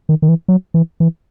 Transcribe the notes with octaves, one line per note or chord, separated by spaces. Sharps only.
D#3
D#3
E3
F#3
E3
E3